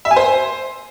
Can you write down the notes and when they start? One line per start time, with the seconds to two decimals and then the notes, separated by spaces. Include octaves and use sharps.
0.05 E5
0.11 G#5
0.16 C5